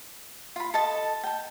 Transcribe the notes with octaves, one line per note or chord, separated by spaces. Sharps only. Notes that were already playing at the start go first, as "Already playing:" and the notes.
F4 B5
A4 D#5 A5
G5 A5